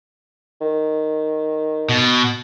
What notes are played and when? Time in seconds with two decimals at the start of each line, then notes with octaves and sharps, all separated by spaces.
0.61 D#3
1.89 B2